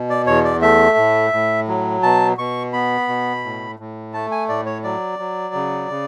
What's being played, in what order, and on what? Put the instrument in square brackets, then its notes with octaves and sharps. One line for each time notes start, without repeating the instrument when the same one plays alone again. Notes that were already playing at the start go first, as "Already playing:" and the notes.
Already playing: [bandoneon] B2
D5
E2 C#5
D5
A3 E5
A2
A2
F#3
B2 A5
B2 C#6
B3 B5
B2
A2
A2
A3 A5
G#5
A2 D5
C#5
F#3 D5
F#3
C#3
C#3